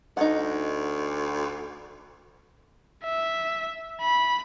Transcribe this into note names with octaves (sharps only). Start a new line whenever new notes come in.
D2 D#4 F#5
E5
B5